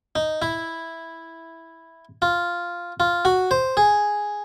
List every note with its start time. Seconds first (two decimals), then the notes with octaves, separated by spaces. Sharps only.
0.16 D#4
0.42 E4
2.22 F4
3.00 F4
3.25 F#4
3.51 C5
3.77 G#4